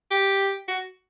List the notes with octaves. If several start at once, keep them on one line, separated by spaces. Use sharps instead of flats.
G4
F#4